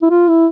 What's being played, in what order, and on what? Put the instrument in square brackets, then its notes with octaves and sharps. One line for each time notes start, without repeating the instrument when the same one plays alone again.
[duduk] E4
F4
E4